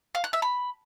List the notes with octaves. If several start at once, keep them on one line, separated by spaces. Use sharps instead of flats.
F5
F#6
E5
B5